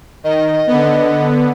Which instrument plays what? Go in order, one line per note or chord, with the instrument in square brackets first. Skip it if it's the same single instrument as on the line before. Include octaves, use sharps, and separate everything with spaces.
[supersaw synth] D#3 [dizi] D#5
[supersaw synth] D3 B3